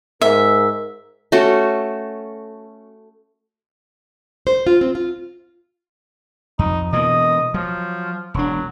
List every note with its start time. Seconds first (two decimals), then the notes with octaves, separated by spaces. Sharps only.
0.22 G#2 A#4 E5
1.32 A3 C#4 F#4 A4
4.47 C5
4.67 F4
4.81 C4
4.95 F4
6.59 F2 D#4
6.93 B2 E3 A#3 D#5
7.54 F3 F#3
8.34 E1 F#3 D4